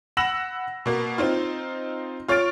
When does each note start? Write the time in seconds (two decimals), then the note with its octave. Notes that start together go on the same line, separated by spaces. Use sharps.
0.17 F#5 B5 E6 A#6 E7 F#7
0.86 B2 A#3
1.18 C4 D#4 F4
2.28 F4 C#5 F6 A6 D7